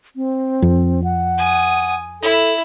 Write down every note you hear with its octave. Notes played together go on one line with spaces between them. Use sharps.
C4
F2
F#5
G#5 D#6
E4 A4